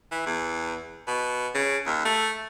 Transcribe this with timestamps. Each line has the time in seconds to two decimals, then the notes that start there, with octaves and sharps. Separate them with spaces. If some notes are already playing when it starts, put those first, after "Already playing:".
0.11 E3
0.26 E2
1.07 B2
1.54 C#3
1.86 D#2
2.05 A3